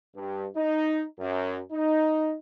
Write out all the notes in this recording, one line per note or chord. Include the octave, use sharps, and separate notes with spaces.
G2
D#4
F#2
D#4